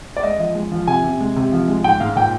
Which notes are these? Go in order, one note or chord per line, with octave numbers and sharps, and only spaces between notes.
D5
G#3 D#5
F3 D#5
G#3
F3
C3 G#5
C3
G#3
C3
F3
G#3
G#2 G5
G#2 F5
A#2 G5